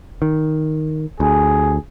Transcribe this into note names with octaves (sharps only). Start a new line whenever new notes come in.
D#3
D2 G#4